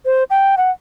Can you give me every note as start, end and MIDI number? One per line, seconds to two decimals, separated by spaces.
0.05 0.24 72
0.30 0.55 79
0.57 0.71 78